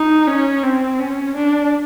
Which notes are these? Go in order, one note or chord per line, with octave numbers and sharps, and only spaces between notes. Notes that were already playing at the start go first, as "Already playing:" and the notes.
Already playing: D#4
C#4
C4
C#4
D4